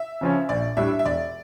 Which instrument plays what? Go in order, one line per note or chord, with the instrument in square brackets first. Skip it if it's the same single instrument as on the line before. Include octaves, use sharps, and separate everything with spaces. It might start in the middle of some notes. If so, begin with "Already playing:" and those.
Already playing: [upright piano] E5
[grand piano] C#3 F3 C#4
[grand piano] A#1 [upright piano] D5
[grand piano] A2 G3 D4 [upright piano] E5
[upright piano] E5
[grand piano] E1 [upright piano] D5